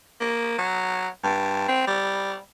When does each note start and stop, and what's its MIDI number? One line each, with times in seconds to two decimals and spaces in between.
0.21 0.54 58
0.58 1.08 54
1.24 1.63 43
1.68 1.83 60
1.87 2.36 55